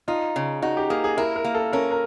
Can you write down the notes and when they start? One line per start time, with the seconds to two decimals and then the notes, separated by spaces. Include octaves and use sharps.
0.08 D#4 F4
0.36 C#3
0.62 D#4 F#4
0.77 G4
0.90 A#3 G#4
1.04 G#4
1.17 E4 A#4
1.36 A#4
1.44 A#3
1.55 A4
1.73 C#4 A#4
1.91 A#4